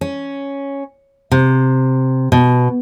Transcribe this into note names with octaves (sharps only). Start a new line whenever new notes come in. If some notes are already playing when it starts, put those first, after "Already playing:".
C#4
C3
B2